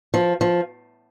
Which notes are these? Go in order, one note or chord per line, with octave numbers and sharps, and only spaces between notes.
F3
F3